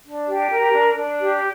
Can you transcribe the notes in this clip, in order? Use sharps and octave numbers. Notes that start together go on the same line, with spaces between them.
D4
G4
A#4
D4
D4
G4